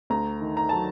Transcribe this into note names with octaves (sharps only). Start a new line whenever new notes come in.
D2 A#5
D#3
A#5
F#3 A5